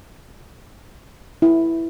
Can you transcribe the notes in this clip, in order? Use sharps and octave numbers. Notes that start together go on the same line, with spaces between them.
E4